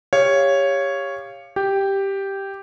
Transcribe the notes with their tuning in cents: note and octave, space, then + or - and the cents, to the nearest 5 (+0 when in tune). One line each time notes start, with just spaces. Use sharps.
G4 +25 C#5 +0 F5 -10
G4 +0 G5 +0